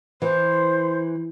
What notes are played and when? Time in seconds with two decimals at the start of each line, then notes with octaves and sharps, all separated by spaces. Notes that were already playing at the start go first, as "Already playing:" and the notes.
0.22 E3 C5